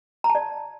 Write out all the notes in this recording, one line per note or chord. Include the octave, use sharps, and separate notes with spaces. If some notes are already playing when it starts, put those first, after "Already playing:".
A#5
A5
D5